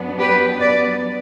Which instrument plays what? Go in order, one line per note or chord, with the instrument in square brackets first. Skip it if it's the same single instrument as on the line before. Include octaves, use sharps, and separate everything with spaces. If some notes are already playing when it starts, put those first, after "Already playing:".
Already playing: [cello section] F#2 F#3 B3 D4
G4 B4
B4 D5